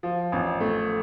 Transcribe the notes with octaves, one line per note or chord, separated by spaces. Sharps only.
F3
A1
A3